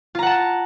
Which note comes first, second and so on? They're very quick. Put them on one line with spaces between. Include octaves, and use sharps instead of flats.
F4 A#5 F#5 A5